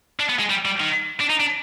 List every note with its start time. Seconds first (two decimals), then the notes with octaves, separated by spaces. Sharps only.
0.19 D4
0.29 B3
0.39 G#3
0.50 G3
0.65 G3
0.80 D#3
1.20 D4
1.30 D#4
1.40 D4